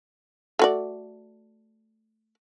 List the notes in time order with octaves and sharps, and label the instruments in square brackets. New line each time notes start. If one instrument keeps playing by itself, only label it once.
[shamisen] A3 F#4 D5